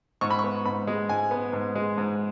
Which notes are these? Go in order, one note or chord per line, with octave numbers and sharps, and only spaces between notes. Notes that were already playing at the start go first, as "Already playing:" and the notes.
G#2 C#6
B5
B3 C#6
G#2 B5
G#3
G#2 G#5
B3
G#2
G#3
G#2